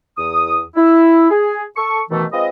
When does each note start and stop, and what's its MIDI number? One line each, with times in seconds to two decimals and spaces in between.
0.18 0.61 40
0.18 0.61 87
0.76 1.26 64
1.30 1.62 68
1.77 2.00 69
1.77 2.00 85
2.10 2.24 47
2.10 2.24 51
2.10 2.24 52
2.10 2.24 57
2.32 2.48 56
2.32 2.48 60
2.32 2.48 65
2.32 2.48 71
2.32 2.48 75